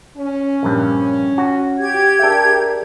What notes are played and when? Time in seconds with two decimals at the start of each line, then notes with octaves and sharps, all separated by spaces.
0.16 C#4
0.63 A#1 G2
1.38 F#4
1.78 G4 G#6
2.19 D4 G#4 A#4 E5